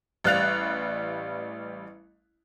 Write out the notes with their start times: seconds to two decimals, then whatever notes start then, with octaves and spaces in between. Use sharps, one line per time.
0.24 A1 G3 F5 F#6 A6 F7